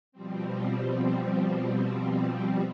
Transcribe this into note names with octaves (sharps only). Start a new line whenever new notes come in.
B2 F3 G3 C4